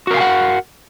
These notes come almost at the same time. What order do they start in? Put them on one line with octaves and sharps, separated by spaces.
F#4 A#4 F5 G#5 F#5